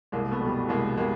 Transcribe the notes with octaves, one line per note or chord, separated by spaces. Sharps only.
C2 G#3 A#3
A3 B3
B2 G3
C2 G#3 A#3
B2 G3 G#3 A#3